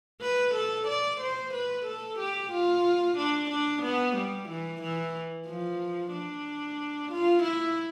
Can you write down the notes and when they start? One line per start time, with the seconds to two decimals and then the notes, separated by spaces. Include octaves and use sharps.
0.22 B4
0.54 A4
0.87 D5
1.20 C5
1.54 B4
1.85 A4
2.19 G4
2.52 F4
3.17 D4
3.50 D4
3.82 B3
4.16 G3
4.49 E3
4.82 E3
5.47 F3
6.12 D4
7.11 F4
7.43 E4